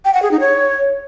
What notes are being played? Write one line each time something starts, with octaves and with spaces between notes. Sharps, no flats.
G5
F#5
G#4
D#4
C#5